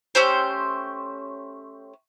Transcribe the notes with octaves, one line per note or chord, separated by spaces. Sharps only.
A3 C#4 G4 C5